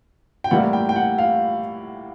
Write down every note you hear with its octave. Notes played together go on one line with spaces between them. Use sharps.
G5
A2 E3 G3 A#3 F#5
G5
G5
F#5
F5